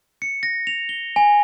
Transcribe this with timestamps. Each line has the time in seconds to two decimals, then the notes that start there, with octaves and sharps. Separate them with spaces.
0.22 C#7
0.43 A#6
0.67 F7
0.89 G7
1.16 G#5